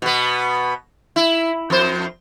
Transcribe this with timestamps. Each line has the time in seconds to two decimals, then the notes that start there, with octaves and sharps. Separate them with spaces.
0.02 B2 B3
1.16 E4
1.70 F2 C5